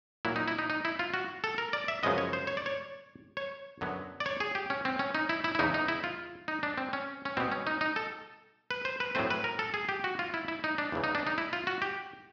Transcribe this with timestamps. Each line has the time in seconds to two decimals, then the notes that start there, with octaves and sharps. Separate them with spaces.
0.25 A#2 F#3 A#3 E4
0.36 D#4
0.48 E4
0.59 D#4
0.70 D#4
0.85 E4
0.99 F4
1.14 F#4
1.44 A4
1.58 A#4
1.73 D5
1.88 E5
2.03 F#2 C#3 F3 G#3 B3 D#5
2.18 C#5
2.33 C5
2.47 C#5
2.57 D5
2.66 C#5
3.37 C#5
3.81 F#2 D3 F#3 B3
4.20 D5
4.26 C#5
4.40 G#4
4.55 G4
4.70 C#4
4.85 C4
4.99 C#4
5.15 D#4
5.29 E4
5.44 E4
5.55 E4
5.59 E2 C#3 E3 D#4
5.74 D#4
5.88 E4
6.04 F4
6.48 D#4
6.63 D4
6.78 C4
6.93 C#4
7.25 C#4
7.37 B2 G3 B3 C4
7.52 C#4
7.67 D#4
7.81 D#4
7.96 A4
8.71 B4
8.85 C5
9.00 B4
9.15 A2 F#3 A3 C4 C5
9.30 B4
9.44 A#4
9.59 A4
9.74 G#4
9.89 G4
10.04 F#4
10.19 F4
10.34 E4
10.48 E4
10.64 D#4
10.78 D4
10.92 E2 C#3 E3
11.04 D#4
11.15 D4
11.27 D#4
11.38 E4
11.53 F4
11.67 F#4
11.82 G4